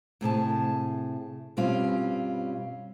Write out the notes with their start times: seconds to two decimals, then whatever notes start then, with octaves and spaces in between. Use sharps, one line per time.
0.21 A2 C3 G#4 A5
1.57 G2 B2 G3 C4 C#4 F4